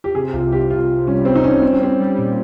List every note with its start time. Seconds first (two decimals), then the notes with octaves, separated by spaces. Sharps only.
0.04 G4
0.15 C3 G#4
0.33 C2 F4
0.52 C2 G4
0.70 C2 F4
0.88 C3
1.07 G3 C#4
1.25 C3 C4
1.36 D#4
1.44 G3 C#4
1.62 G3 C4
1.73 C#4
1.81 G3 C4
2.00 G3
2.18 A#2